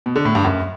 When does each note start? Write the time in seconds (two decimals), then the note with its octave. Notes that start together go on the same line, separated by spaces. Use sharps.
0.06 B2
0.16 D3
0.25 A2
0.35 G2
0.45 F#2